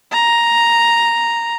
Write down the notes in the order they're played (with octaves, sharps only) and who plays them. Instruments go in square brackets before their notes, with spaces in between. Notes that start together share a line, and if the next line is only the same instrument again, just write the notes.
[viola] A#5